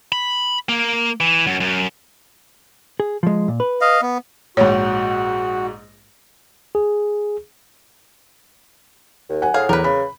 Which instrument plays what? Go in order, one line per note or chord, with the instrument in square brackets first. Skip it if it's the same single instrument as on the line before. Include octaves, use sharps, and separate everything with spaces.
[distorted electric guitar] B5
A#3
E3
F#2
F#2
[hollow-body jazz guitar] G#4
F3 G#3
A#2
B4
[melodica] D#5 F5
B3
[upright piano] A#1 G#2 [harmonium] F#4 [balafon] C#5
[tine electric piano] G#4
[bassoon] D#2
[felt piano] F#5 G#5
[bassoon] A2 [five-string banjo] G#4 F5
[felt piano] E2 [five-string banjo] A#4 B4
[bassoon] C#3 [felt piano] B5